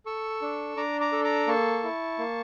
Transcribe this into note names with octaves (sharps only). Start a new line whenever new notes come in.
A4 C#6 E6
D4
D4 A#5 D6
A#5 D6
A4
A#5 D6
A#3 A5 C#6
E4
A#3